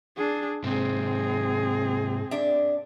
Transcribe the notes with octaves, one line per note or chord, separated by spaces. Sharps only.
D4 G#4
G#2 C3 C4 G#4
D4 E5